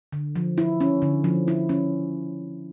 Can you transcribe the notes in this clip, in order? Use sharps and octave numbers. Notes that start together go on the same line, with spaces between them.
D3
F3
E4
C#4
D3
F3
E4
C#4